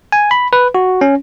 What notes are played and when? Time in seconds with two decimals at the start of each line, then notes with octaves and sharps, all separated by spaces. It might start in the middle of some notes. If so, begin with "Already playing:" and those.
0.12 G#5
0.31 B5
0.53 B4
0.75 F#4
1.01 C#4